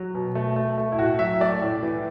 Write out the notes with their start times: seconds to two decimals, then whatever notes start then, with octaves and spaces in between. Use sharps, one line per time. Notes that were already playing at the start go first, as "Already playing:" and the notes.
Already playing: F#3
0.15 B2
0.35 A3
0.56 A3
0.78 A3
0.92 E4
0.98 A2 F#4
1.19 F#3 E5
1.41 A3 D5
1.61 A2
1.83 E3